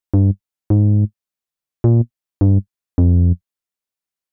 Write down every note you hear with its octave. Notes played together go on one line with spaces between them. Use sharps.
G2
G#2
A#2
G2
F2